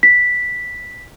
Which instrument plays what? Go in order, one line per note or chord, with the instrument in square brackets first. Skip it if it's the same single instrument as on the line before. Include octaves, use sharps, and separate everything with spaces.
[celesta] B6